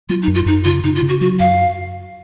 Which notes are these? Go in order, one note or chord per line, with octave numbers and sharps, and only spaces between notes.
F#3 F4
D#4
F#2
F4
F#2 D#4
C#3 F4
C#3 D#4
F4
C#3
F#4
F#3 F#4
F#2 F5